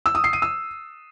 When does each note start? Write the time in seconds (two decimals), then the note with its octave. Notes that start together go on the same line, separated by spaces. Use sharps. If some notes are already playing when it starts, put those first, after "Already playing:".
0.06 E6
0.15 D#6
0.24 C7
0.33 D#7
0.42 E6